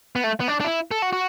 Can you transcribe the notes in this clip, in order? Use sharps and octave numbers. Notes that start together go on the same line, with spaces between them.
B3
A3
B3
D4
D4
E4
A4
F#4
F#4